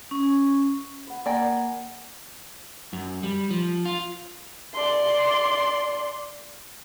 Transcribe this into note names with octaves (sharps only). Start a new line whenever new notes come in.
C#4
B4 F#5
A#3 D5 G5 G#5 A#5
F#2
G3
F3
F4
D5 C6